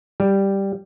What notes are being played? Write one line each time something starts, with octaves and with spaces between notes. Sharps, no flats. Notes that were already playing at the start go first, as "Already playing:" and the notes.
G3